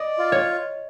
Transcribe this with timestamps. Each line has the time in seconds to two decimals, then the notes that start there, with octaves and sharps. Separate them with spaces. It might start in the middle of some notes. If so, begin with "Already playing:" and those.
Already playing: D5 D#5
0.18 F4
0.32 C#5